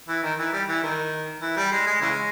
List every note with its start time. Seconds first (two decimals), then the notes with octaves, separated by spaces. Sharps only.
0.09 E3
0.23 D#3
0.38 E3
0.53 G3
0.68 E3
0.83 D#3
1.42 E3
1.56 G3
1.71 G#3
1.86 G#3
2.01 C#3 E3 G#3